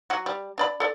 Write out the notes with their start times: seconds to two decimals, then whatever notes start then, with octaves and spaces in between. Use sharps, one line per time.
0.10 F#3 F#4
0.26 G3
0.58 D4 D5 B5
0.80 A4 D5